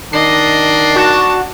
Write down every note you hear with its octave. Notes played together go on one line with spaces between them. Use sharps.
D#3 D4 D#5 C7
F#4 A5